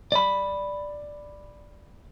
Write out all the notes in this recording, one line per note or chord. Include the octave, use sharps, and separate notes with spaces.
D5 B5